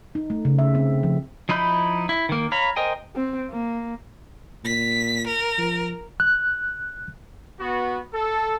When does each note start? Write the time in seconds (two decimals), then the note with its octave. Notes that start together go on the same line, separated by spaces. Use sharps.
0.15 D#4
0.30 A3
0.45 C#3
0.59 E5
0.75 C4
1.03 F3
1.49 F3 D#4 E4 B5 G6
2.09 E4
2.29 D#3 A#3
2.52 C#5 F5 A#5 B5
2.76 A#4 C5 D#5 G5 G#5
3.16 C4
3.51 A#3
4.65 A#2 B6
5.27 A#4
5.58 F3
6.20 F#6
7.60 B3 F#4
8.14 A4